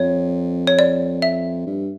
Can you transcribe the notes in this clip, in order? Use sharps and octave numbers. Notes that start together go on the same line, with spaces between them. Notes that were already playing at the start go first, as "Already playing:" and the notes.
Already playing: F2 C#5
C#5
D5
E5
G2